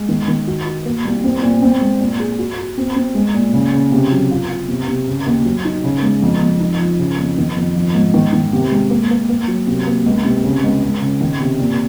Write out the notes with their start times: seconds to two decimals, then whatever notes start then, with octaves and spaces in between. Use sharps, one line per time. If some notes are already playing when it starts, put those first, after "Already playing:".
Already playing: G#3
0.09 D#3
0.28 D#3
0.47 F#4
0.66 F#4
0.85 A#3
1.05 C2
1.24 C4
1.42 A#2
1.62 C4
1.81 G#3
2.00 A#2
2.20 G#4
2.39 F#4
2.58 F#4
2.78 C4
2.96 C4
3.15 G#3
3.34 A#2
3.53 C#3
3.73 C#3
3.92 C3
4.12 F#3
4.31 F4
4.49 F4
4.68 C3
4.88 C3
5.08 C#3
5.26 D#2
5.45 F#3
5.65 D#4
5.84 C#3
6.02 G#3
6.22 F2
6.41 F2
6.60 D#4
6.80 F3
6.99 C#3
7.19 F2
7.38 D#3
7.56 F2
7.76 F3
7.95 G#2
8.14 D#3
8.33 D#3
8.53 C3
8.71 G#3
8.90 A#3
9.10 A#3
9.29 A#3
9.48 F#3
9.67 C3
9.87 A#3
10.06 C#2
10.25 C3
10.44 C#3
10.63 C#2
10.83 C#2
11.01 C#3
11.21 D#3
11.40 C3
11.59 A#2